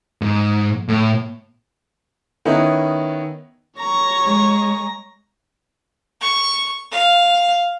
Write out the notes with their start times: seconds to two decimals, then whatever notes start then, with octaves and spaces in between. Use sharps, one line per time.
0.22 G#2
0.89 A2
2.45 D#3 B3 C#4 D#4 E4
3.80 C#5 A#5 C#6
4.26 G#3
6.21 C#6
6.91 F5